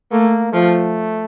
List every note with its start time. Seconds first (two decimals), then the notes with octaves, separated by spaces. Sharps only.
0.12 A3 A#3
0.52 F3 A3